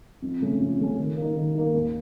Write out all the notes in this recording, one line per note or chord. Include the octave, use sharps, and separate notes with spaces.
F2
C#3 A3 C#4
F2
C#3 A3 C#4
D#3
A#3 D#4
D#3
A#3 D#4
D#2